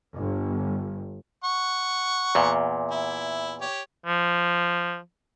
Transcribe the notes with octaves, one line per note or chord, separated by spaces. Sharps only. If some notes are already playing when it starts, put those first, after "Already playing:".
G1
F#5 C#6
E2 A#2
E4
G4 C#5
F3